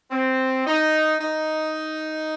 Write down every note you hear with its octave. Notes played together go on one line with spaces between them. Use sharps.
C4
D#4
D#4